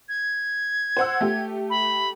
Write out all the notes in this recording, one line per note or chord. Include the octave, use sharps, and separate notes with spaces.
G#6
C5 F#5 E6
A3 G4
B5